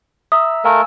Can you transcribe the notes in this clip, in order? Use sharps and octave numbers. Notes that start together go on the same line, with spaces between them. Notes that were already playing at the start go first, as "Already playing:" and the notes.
E5 A#5 D#6 E6
A3 A#4 F5 G#5 E6